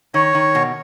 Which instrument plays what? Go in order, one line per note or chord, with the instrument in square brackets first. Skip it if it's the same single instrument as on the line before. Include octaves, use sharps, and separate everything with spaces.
[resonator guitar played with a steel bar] D#3 [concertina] C#5
[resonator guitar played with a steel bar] D#3
B2